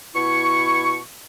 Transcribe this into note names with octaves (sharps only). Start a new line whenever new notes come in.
B2 E4 C#6